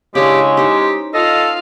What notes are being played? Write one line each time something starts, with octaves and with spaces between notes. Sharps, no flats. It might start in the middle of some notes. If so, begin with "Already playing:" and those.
C#3 G#3 C#4 D4 E4 G4
D#4 G4 C5 C#5
F4 A4 D#5 F5